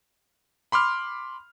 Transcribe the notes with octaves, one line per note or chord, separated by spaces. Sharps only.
B5 C6 D6 F6